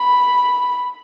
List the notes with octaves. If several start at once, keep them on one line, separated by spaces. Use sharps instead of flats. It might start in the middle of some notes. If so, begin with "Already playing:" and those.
Already playing: B5